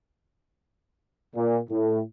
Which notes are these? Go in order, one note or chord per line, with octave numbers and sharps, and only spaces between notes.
A#2
A2